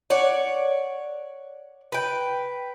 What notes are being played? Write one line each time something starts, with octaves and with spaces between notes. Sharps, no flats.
C#5 D5 F#5
B4 G5